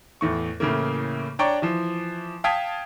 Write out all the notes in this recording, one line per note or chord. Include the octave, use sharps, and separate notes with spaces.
E2 A2 C#6
A2 C#3 E3 A#3
D4 C#5 D5 G5 A#5 C#6
E3 F3
F5 G5 A5 D#6 G#6 B6